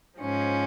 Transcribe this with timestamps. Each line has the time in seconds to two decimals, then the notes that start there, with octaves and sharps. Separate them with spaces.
0.20 G#2 F3 G#3 C#4